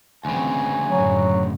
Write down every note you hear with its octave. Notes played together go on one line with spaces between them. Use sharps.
D2 C#3 E3 F#3 C4 G#5
F#2 A2 F#3